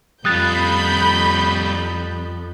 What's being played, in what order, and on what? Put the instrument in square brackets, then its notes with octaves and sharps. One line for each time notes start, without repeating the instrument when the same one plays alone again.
[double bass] F2 [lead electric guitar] G3 F4 [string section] B5 G6 [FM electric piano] D#6 F#6 A6